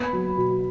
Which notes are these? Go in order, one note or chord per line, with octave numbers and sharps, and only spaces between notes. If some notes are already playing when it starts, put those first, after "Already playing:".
Already playing: B3 B5
F#3
B2